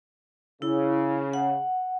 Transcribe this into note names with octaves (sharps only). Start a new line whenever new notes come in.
C#3 E4
F#5